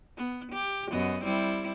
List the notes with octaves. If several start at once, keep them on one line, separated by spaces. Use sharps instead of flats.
B3
G4
F#2 B3 D#5
G3 C4 E4